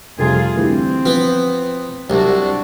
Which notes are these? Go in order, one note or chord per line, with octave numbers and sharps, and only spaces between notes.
F1 F2 C3 G3 F4 G#4
D2 E3 G3 C4
F3 B3
C2 F#3 D4 F#4